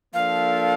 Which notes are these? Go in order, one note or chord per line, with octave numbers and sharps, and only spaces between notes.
F3 A#3 D4 A4 F5